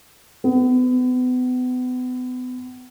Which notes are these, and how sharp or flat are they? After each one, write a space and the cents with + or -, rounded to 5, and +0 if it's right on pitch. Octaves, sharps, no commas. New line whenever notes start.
B3 +35